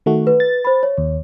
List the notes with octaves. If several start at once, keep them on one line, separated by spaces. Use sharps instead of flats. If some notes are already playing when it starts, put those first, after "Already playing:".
D#3 A3 F#4
B4
A6
C5 B5
C#5
D#2